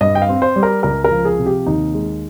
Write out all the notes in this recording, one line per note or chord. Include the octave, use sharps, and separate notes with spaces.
G2 D#5
G5
F5
C4
C5
G3
A#4
C#2 A#4
A#4
F3
G#4
C3
G4
D#2 D#4
G#3